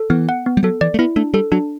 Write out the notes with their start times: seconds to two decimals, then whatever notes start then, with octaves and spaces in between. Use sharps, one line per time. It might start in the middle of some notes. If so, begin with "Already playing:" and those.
Already playing: A4
0.10 E3 B3
0.29 F#5
0.46 B3
0.57 G3
0.63 F#3 A4
0.81 E3 D5
0.94 A3
0.99 B3 E4
1.16 A3 D4
1.34 G3 A4
1.52 F#3 D4